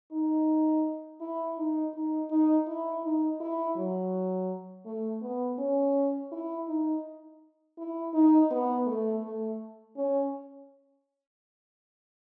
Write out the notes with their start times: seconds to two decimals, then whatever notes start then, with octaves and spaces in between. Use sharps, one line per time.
0.12 D#4
1.20 E4
1.58 D#4
1.94 D#4
2.30 D#4
2.67 E4
3.03 D#4
3.40 E4
3.76 F#3
4.85 A3
5.22 B3
5.58 C#4
6.31 E4
6.68 D#4
7.78 E4
8.14 D#4
8.50 B3
8.86 A3
9.23 A3
9.96 C#4